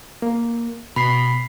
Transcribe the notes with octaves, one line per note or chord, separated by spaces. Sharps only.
A#3
B2 B5 B6 C7